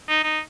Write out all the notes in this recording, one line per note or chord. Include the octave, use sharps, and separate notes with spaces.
D#4
D#4